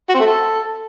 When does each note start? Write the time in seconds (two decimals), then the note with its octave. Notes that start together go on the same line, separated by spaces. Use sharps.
0.09 F#4
0.15 C4
0.20 A3
0.26 A4